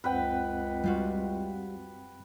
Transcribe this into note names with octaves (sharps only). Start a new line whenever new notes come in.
C#2 F#2 C4 B4 F#5 G5
G3 F4 F#4